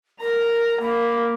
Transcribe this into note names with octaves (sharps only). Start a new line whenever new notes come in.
A#4 A#5
A#3 B5